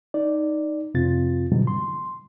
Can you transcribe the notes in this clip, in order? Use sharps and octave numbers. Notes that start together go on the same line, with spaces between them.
D#4 D5
F2 C3 C4 F4 A6
G#2 B2 D3 E3 F#3 G3
C6